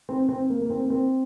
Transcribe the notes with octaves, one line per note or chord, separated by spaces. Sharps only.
C4
C4
A#3
A#3
C4
A#3
C4